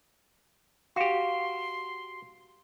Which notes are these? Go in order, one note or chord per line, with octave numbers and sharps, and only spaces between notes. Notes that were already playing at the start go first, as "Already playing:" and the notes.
F#4 G4 F5 C6